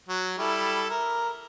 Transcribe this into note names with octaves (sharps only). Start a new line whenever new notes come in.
F#3
G3 E4 A4
A#4